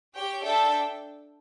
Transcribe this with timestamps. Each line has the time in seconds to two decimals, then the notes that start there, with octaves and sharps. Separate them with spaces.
0.16 G4 C#5 G5
0.44 D4 A4 E5 G5